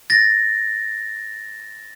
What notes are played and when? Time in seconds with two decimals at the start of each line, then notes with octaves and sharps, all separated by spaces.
0.10 A6 A#6